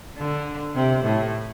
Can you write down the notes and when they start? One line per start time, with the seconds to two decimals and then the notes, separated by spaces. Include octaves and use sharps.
0.17 D3
0.75 C3
1.04 A2